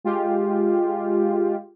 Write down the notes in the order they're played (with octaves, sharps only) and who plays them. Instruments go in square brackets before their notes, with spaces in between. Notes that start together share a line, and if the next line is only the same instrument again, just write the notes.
[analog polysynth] G#3 F4 G4